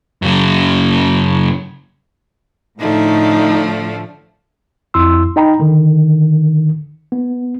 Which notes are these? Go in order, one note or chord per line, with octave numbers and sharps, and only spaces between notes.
F#2 C#3
A2 D3 F3 A3 D#4
F2 E4 C6 E6
D#4 D#5 G5 A#5 B5
D3 D#3
B3